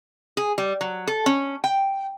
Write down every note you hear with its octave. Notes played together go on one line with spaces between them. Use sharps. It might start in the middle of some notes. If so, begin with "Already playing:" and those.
G#4
G3
F#3
A4
C#4
G5